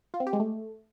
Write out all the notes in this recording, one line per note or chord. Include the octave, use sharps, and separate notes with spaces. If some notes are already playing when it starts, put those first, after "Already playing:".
F4
C4
G4
G#3
A3